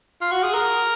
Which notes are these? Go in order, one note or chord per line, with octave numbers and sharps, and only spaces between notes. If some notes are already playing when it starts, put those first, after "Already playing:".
F4
F#4
G#4
A#4